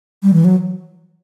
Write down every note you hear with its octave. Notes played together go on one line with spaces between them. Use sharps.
G3
E3
F#3